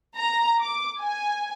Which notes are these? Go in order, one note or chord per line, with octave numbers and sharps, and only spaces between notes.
A#5
D6
G#5